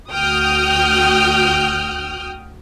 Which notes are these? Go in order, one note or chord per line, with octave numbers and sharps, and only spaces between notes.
D2 F#4 G5 D#6 F6 G6